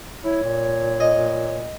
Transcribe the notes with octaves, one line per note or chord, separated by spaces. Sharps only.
E4 C#5
A#2
D#5